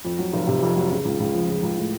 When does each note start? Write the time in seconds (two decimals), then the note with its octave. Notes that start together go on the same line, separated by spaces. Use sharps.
0.05 F2
0.19 F#3
0.33 F1
0.47 C3
0.62 F2
0.76 F#3
0.91 C#3
1.05 C#2
1.20 C#2
1.34 F3
1.48 C#3
1.63 C#2
1.78 A2